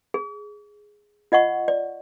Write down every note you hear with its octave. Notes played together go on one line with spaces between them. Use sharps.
G#4
F4 D#5 F#5 C#6
D5